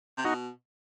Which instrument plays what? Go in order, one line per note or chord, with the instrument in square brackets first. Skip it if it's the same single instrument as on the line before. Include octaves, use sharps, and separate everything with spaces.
[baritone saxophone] C3
[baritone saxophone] B2 [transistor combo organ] D#4 F#4